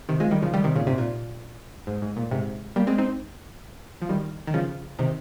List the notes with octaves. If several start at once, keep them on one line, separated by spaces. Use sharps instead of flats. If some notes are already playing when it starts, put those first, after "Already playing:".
C3 D#3
F3 G#3
D#3 G3
C#3 F3
D#3 G3
C3 D#3
A#2 C#3
G#2 C3
A#2
G#2
G#2
A#2
G#2 C3
G3 A#3
G#3 C4
C4 D#4
F3
D#3 G3
D#3
C#3 F3
C3 D#3